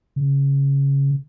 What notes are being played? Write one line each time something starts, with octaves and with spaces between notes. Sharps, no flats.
C#3